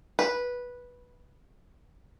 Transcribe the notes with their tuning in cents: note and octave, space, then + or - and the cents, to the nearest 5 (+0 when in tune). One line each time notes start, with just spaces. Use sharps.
B4 -10